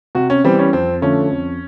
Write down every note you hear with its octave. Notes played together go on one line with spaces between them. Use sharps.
C3 F#4
C#4
E3 G3 B3 C4
C#4
F2 C4
D3 F3 A3 C#4
F2